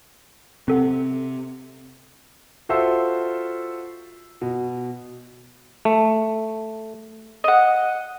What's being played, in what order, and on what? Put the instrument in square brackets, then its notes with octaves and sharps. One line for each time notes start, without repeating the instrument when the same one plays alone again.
[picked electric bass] C3 [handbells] C4 A4 F#5
[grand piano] F4 F#4 A4 C5 E5 E6
B2
[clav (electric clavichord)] A3
[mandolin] D#5 F#5